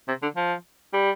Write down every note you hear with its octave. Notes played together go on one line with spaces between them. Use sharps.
C3
D3
F3
G3